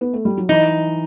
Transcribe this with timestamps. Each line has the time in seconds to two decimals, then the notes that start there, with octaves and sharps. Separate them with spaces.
0.01 B3
0.13 A3
0.25 G3
0.37 F#3
0.49 E3 D#4